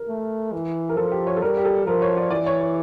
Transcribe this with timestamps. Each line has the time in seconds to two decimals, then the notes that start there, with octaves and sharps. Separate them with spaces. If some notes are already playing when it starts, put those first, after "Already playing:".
Already playing: A#4
0.08 A3
0.53 E3
0.89 A#4
0.97 F3 A4
1.12 G4
1.27 C#5
1.36 A4
1.42 G3 A#4
1.57 G4
1.65 A4
1.87 F3 A#4
2.02 C#5
2.17 D5
2.30 E3 D5
2.46 C#5
2.61 C#5